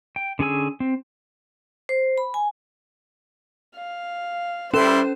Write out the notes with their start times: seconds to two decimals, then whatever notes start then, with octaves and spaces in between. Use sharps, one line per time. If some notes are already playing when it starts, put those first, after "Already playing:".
0.16 G5
0.39 D3 C#4 G#4 G#5 E6
0.80 C4
1.89 C5
2.18 B5
2.34 G#5
3.76 F5
4.74 G3 C#4 E4 A4 C5 C6 E7